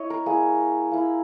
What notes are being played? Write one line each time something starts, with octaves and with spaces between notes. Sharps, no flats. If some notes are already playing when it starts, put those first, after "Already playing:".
Already playing: E4 C#5 D#5
A#4
A#3 E4 G#4
A#3 E4